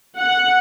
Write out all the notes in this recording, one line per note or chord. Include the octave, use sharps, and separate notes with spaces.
F#5